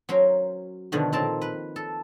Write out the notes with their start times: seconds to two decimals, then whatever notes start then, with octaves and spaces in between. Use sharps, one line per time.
0.09 F#3 C#4 A#4 C5
0.92 B2 D3 D#3 F3
1.12 A#2 C4 A#4 A5
1.42 B4
1.76 A4